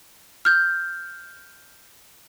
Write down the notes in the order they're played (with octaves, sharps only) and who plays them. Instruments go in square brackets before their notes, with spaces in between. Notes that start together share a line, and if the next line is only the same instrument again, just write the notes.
[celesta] F6 G6